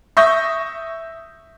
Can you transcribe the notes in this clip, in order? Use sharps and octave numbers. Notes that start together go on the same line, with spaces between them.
E5 C#6 D#6 G6 A#6